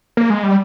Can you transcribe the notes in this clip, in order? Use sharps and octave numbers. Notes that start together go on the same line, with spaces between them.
A#3
G#3
G3